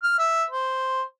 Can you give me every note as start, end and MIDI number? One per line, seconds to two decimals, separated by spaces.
0.03 0.18 89
0.19 0.44 76
0.50 1.02 72